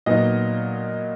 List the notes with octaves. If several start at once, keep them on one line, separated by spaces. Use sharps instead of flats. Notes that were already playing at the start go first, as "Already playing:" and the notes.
A#2 F#3 B3 D#4 D#5